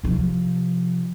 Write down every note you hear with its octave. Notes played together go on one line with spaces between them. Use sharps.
C3 F3